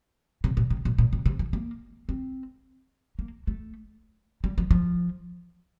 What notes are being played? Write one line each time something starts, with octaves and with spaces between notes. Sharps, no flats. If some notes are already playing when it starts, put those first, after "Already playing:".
C3
A#2
C3
A#2
A#2
C3
C3
E3
A#3
C4
A#3
A3
G3
F3
F3